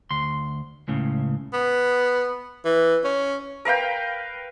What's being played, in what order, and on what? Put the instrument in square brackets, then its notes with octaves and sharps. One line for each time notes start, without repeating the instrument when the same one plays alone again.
[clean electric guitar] D2 C6
C#2 A2 C#3
[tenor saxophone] B3
E3
C#4
[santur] A#4 B4 F5 G5